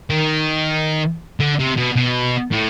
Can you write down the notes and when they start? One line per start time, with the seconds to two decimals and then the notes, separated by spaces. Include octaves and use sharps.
0.10 D#3
1.40 D3
1.59 C3
1.77 B2
1.96 B2
2.52 A2